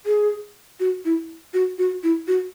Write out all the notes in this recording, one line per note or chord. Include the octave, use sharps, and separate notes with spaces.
G#4
F#4
E4
F#4
F#4
E4
F#4